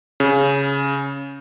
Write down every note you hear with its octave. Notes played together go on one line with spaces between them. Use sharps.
C#3